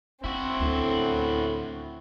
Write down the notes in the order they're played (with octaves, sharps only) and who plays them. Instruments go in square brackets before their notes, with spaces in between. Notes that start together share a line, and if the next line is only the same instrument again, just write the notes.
[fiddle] C4 [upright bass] C#4 [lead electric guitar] E4 F#4
[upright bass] D2 D4 [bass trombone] A2